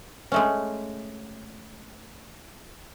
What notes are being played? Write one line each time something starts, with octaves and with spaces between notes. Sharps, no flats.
G#3 A3 C#4